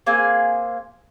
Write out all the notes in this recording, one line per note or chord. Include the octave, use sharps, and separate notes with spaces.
A#3 C4 G#4 G#5